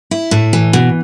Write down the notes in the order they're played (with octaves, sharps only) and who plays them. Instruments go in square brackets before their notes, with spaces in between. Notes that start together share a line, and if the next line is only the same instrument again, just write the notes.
[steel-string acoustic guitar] E4
A2
E3
B2